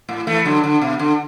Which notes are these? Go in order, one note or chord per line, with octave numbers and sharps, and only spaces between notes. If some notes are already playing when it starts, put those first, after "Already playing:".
A2
E3 A3
D3 F#3
D3
B2
D3